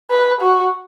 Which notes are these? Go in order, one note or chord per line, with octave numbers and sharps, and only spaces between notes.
B4
F#4